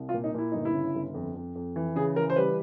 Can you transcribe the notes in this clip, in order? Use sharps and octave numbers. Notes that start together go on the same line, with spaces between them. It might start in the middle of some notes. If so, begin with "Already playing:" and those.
Already playing: C2
F4
A#2
D#4
A#2 E4
G1 D#4
E4
C#3
G1
F2
F2
F2
E3
C#3 G#4
E3 A#4
C5
G3 B4